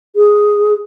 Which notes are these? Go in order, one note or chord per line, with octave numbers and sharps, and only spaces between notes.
G#4